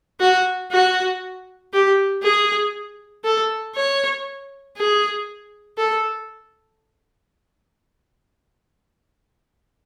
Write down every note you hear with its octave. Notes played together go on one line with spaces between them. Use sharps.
F#4
F#4
G4
G#4
A4
C#5
G#4
A4